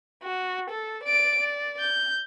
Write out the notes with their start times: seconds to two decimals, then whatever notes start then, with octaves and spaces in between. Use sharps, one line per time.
0.23 F#4
0.70 A4
1.04 D5 D7
1.38 D5
1.80 G6